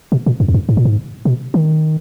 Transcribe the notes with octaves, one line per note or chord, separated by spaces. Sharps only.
B2
A#2
F#2
E2
F#2
G#2
A#2
G#2
B2
D#3